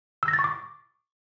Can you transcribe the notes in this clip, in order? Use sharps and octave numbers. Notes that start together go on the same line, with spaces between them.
E6
A#6
A6
C#6
D6